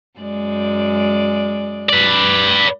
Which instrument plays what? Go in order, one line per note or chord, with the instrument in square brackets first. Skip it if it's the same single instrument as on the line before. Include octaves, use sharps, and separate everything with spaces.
[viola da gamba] F#2 G#3 D5
[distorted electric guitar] B4 D5